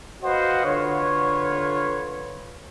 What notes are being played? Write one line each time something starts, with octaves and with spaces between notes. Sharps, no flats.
F#4 B4 C5 D#5 F5 F#5
D3 F4 B4 C#5